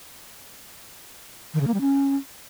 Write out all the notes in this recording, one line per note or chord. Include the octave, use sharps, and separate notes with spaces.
D#3
C#3
A#3
G3
C#4